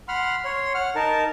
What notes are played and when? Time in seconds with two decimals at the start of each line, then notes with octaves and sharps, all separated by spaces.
0.08 F#5 B5 C6 F6
0.45 C#5 C6
0.75 F#5 F6
0.95 D#4 A#4 A5